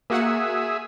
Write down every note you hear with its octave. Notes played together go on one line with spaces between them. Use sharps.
A#3 F#4 G#4 E5 F#5